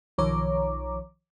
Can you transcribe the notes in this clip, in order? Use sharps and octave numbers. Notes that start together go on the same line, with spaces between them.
B1 D#3 F3 C#5 A#5 D6